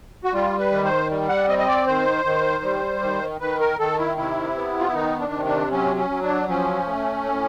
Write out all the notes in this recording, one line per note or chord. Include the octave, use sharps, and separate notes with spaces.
F#4
G3 F4
B4
D#3
C5
G3
F#5
C4 D#5
D#5
D5
D#3 C5
D#3
G3
D#3
D#3 B4
A#4
D#3 A4
E4
C3 E4
B3
F4
E4
D#3 D#4
D4
C3
D4
F#3 C#4
C#4
F#3
D4
F3 C#4
A3
A2